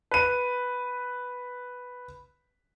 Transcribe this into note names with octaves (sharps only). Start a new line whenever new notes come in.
B4 D#7